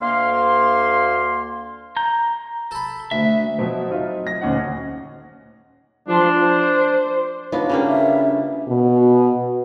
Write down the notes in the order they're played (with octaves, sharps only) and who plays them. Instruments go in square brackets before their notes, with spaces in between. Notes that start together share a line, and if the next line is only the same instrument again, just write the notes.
[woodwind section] D2 A#3 F5 C6
[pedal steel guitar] A#5 G6
[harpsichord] A4 B5
[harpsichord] D2 [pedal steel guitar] E5
[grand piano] B2 F3 F#3
F#3 C4 D#4 F4 E5
A#6
D#1 D2 C#4 D#4 F#5
[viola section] F3 A5 C6 [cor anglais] D4
[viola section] C5
[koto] B3 [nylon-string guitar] D4 F4 F#4 [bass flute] D#4 [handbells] C#5 B5
[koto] C#3 G3 A#3
[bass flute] E5
[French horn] B2